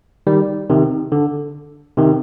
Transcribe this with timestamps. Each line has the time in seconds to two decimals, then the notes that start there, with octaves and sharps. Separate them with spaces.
0.27 D#3 G3
0.70 C3 D#3
1.12 D3
1.98 C3 D#3